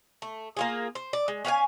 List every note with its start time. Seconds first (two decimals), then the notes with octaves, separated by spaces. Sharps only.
0.22 A3
0.57 A#3 F4 G#4
0.95 C5
1.13 D5
1.28 G#3
1.45 C#4 F5 F#5 G#5